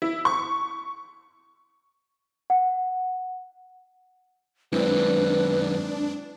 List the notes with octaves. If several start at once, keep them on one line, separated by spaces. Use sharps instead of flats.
E4
C#6
F#5
F#2 D#3 G#3 C4 D4 E4 B4